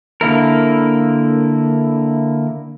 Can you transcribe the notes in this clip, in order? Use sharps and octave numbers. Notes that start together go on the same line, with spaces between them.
D3 A#3 E4 A#4